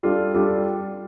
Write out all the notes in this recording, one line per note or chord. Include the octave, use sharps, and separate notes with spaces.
G3 D4 F4 A4
G3 D4 F4 A4